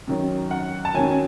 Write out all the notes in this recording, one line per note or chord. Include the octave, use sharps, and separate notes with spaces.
F#2 D#3 F#3
F#5
A5
F#2 D#3 F#3 G#5